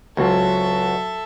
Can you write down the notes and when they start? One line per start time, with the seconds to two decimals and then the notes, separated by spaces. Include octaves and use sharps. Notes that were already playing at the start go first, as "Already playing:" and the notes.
0.17 C#2 F#3 C4 F#4 A4 E5